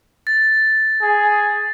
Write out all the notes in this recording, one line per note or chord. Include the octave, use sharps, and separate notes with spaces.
A6
G#4